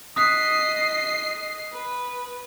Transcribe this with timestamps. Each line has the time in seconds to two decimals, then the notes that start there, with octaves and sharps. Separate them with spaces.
0.16 D#5 D#6 F#6 B6 C7
1.72 B4